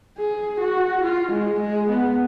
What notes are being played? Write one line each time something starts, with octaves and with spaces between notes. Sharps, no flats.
G#4
F#4
F4
G#3
G#3
B3